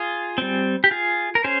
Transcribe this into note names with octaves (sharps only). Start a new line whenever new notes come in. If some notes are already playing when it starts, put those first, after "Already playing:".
Already playing: F4 G#4
G3 C4
G4
F4 G#4
A#4
C#4 G#4 C5